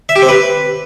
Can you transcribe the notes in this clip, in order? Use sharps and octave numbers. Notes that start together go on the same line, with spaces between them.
E5
G4
C4
B4